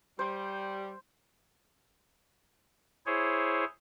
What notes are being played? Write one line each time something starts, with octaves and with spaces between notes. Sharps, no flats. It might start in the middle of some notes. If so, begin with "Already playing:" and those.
G3 C5
E4 G#4 C5 C#5